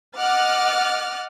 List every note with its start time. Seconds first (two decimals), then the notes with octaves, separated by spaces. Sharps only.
0.18 D#5 F#5 D6 F6 F#6 A6